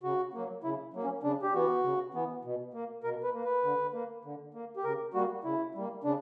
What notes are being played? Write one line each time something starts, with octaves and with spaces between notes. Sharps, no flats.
C#3 F#4
F#3 A#3
C#3 E4
F#3 A#3
C#4
C#3 D4
G4
E3 B3 F#4
C#3
E3 B3
B2
A#3
B2 A#4
B4
A#3
B4
D3
A#3
D3
A#3
G4
C#3 A#4
G3 A#3 F#4
C#3 E4
G3 A#3
C#3 D4